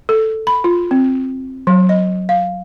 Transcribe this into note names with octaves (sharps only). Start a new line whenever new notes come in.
A4
B5
F4
C4
F#3
D#5
F5